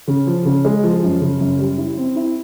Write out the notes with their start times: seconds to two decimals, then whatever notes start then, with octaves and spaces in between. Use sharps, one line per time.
0.08 C#3
0.27 F3
0.45 C#3
0.65 G#3
0.83 F3
1.03 F#2
1.21 C#3
1.40 F#2
1.59 G3
1.78 E4
1.97 C4
2.16 E4